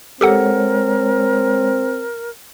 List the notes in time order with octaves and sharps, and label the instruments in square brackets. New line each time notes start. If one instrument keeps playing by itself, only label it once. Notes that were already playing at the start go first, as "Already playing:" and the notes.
[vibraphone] G#3 C#5 [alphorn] C4 [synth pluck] G4 A4 F#5 [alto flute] A#4